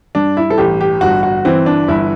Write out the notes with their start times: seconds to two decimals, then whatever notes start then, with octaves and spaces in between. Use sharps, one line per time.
0.15 G2 D4
0.37 E4
0.50 A4
0.58 A1 G4
0.81 G4
1.01 G1 F#4
1.23 F#4
1.45 E3 C4
1.66 D4
1.88 G1 E4